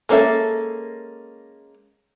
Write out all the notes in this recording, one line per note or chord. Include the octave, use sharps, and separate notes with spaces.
G#3 A#3 C#4 A4 E5